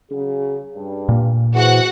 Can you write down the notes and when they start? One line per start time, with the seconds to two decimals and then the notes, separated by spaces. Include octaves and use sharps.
0.11 C#3 F#3 G#4
0.75 G2
1.09 A#2 A#3
1.55 E3 F#4 G#4 C5 F#5